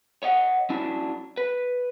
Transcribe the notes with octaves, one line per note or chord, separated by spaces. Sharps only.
C#5 D#5 F#5
F#3 C#4 D4 E4
B4